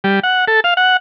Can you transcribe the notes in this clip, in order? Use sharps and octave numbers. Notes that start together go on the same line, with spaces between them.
G3
F#5
A4
F5
F#5